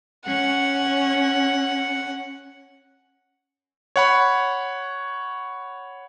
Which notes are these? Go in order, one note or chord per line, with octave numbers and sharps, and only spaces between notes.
C#4 F#5
C#5 F#5 B5